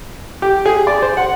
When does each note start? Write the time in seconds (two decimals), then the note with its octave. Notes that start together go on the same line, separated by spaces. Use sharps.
0.42 G4
0.66 G#4
0.87 D5
1.02 C5
1.17 F#5